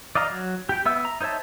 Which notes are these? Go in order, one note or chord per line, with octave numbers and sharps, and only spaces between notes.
D5 D#5 F5 A#5
F#3
G4 G5
B3 E5 E6
A#5
D#4 C5 C#5 E5 A5